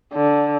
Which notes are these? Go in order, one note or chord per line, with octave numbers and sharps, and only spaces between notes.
D3